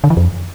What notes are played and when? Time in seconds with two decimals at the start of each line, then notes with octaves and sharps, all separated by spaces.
0.04 D3
0.10 E3
0.17 F2